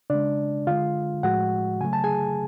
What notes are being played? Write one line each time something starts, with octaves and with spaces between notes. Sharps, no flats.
C#3 G#3 D4 D5
D3 G#3 F4 F5
A2 F3 G#3 F#4 F#5
C#3 F#3 A3 G#5
A5
G#4 G#5